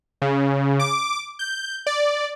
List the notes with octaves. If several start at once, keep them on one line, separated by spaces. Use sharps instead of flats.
C#3
D6
G6
D5